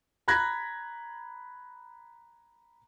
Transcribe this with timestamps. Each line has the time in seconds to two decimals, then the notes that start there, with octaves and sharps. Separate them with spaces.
0.28 A#5 B5 F#6 G#6 A#6 B6